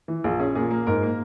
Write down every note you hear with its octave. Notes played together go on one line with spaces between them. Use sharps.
E3
A#1 G#4
C#4 G#4
A#2 G#4
A#3
G#2 A#4
A#3